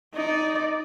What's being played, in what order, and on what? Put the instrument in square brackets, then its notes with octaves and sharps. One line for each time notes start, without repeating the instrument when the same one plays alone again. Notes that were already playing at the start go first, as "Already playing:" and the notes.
[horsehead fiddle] D#4 D5